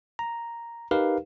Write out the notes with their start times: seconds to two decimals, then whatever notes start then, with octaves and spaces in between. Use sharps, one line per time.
0.19 A#5
0.91 D#4 G4 A#4 B4 F5